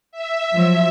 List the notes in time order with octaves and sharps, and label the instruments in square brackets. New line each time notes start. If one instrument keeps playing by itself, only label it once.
[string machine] E5
[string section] F3 F#3